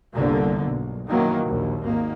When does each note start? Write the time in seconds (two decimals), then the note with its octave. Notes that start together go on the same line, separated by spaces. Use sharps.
0.14 G1 C2 D3 A#3
0.66 B1
1.08 F#2 B2 D#3 E3 F#3 A#3
1.44 A#1 D#2
1.84 G#1 D#3 A#3